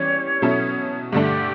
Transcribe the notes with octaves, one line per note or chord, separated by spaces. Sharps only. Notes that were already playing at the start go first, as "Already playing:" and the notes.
Already playing: E3 G3 C#4 G4 C#5 D5
B2 F#3 C#4 E4 A4
G2 D3 A3 D4 G4 A4